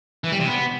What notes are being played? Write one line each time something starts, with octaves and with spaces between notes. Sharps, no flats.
E3
G3
C3
B3